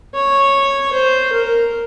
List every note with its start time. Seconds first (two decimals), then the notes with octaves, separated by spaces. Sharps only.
0.14 C#5
0.93 C5
1.32 A#4